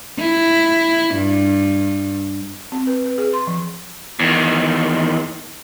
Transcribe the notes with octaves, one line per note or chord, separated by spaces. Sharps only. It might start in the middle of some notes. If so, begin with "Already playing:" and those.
E4
G2
C4
B4
B4
G#4
C6
F3
E2 D#3